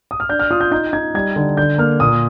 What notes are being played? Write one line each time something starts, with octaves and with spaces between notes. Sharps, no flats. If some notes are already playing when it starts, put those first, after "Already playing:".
D#6
F6
D4 G6
F6
F4 D#6
G6
D#4 G6
D#4 G#6
G3 G#6
D3
D3 G6
A#3 F6
A#2 D#6